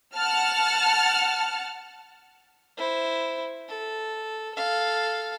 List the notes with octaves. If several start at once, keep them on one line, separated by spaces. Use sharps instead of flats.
F#5 A5 F6
E4 C5
A4
A4 F5